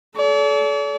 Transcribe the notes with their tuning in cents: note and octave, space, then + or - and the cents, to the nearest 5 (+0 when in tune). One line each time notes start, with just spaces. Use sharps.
A4 -35 D5 -45